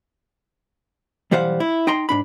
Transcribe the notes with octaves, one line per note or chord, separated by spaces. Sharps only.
B1 E3 G3 C5 F5 F#5
E4
D#4 G5 A#5 C6
G#2 D4 B5